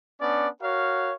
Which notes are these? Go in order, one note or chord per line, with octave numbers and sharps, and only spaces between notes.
B3 C#4 D4 D5
F#4 A#4 C#5 F5